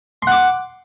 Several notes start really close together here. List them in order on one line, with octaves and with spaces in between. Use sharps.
C6 F#5 D6